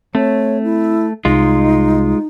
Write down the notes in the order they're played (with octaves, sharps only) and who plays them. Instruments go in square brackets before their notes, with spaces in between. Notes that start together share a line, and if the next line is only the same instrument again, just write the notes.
[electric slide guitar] A3 [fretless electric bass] C4 [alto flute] C#5
[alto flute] E4
[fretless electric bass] C2 [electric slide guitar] G#3 F4 [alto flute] D#4